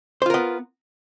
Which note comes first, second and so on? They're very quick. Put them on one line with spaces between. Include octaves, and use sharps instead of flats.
C5 F4 A#4 B3